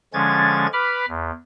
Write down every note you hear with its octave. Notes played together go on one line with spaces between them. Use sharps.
D3 F3 G#3 C#4 G#6 A6
B4 B5 D6 F6
E2